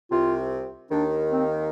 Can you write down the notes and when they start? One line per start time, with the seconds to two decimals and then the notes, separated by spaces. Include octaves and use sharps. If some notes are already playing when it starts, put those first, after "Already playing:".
0.11 C2 C3 F4
0.91 D#2 D#3 D4
1.32 C4